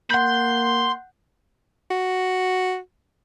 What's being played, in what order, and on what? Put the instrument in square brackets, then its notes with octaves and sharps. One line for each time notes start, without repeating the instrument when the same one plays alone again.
[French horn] A#3 [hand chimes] F#5 G6 [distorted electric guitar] B5 C6
[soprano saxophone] F#4